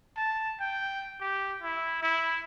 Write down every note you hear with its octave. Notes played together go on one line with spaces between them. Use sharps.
A5
G5
G4
E4
E4